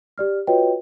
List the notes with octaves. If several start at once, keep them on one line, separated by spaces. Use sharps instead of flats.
G4 D5 F6
F4 F#4 B4 C#5 D#5 G5